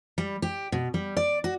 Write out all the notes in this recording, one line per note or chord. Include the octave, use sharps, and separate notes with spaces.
G3
G4
B2
G3
D5
F#4